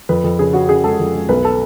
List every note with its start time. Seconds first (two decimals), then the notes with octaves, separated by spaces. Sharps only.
0.09 F2 B4
0.24 F2
0.39 C#3 G#4
0.53 C#3 F#4
0.69 C#3 G#4
0.84 G#3 A4
0.99 F2
1.15 G#3
1.29 B1 B4
1.45 A4